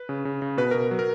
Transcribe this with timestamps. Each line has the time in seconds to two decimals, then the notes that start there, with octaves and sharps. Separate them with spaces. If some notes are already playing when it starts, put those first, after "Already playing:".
Already playing: B4
0.09 C#3
0.25 C#3
0.42 C#3
0.57 B2 B4
0.71 B2 A#4
0.91 F#3
0.99 A#4